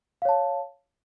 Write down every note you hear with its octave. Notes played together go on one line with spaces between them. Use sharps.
C#5 F5 A5